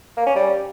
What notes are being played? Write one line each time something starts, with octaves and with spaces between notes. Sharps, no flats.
A#3
C#4
G3